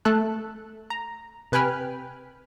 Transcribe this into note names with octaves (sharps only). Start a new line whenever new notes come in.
A3 A4 A5 F#6
A#5
C3 B4 G5 G#5 B5 F6